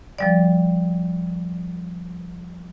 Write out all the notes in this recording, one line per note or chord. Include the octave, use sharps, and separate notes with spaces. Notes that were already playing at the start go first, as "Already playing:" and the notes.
F3 G3 D5